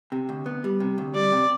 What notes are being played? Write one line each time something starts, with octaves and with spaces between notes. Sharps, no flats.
C3
D2
B3
G3
C3
D2
G3 D5
C3